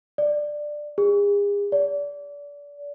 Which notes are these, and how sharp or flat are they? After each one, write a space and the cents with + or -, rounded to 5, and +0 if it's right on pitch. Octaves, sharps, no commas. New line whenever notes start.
D5 +10
G#4 -40
D5 -30